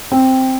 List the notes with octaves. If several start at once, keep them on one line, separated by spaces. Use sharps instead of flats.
C4